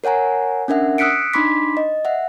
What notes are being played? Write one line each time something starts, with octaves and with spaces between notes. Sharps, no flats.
A#4 C#5 F#5 G#5 A#5
C#4 D4 A#4 E5 F#5
D#6 E6 F#6 B6 C#7 D7
D4 D#4 B5 C6 D6 B6
D#5
E5 F#5